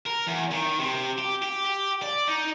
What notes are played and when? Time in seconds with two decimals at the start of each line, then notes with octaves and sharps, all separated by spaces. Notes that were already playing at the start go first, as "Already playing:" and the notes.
0.06 A#4
0.27 E2
0.51 D#3
0.80 C3
1.19 G4
1.42 G4
1.65 G4
2.02 D5
2.27 D#4